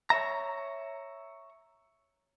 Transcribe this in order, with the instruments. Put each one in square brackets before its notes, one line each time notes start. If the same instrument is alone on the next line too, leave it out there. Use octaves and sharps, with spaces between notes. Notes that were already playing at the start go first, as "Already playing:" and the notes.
[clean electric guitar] C#5 D#5 E5 A#5